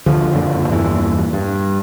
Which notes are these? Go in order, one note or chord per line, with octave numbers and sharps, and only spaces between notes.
D2 D3 F3
F#1 F2 A#2 D3
E2 G2 A#2 E3
G2